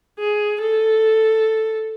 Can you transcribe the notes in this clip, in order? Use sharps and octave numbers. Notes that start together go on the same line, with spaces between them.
G#4
A4